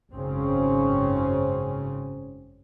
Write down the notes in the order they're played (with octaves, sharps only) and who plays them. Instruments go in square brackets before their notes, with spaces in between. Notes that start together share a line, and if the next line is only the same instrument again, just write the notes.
[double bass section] G#1 F#2 C#3 C4 C#4